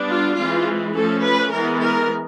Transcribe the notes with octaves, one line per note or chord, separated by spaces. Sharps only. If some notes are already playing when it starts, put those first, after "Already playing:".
Already playing: G3 B3 D4
F4
E3 G#3 C4 F4
F3 A3 C#4 A4
B4
E3 G#3 B3 A#4
A#4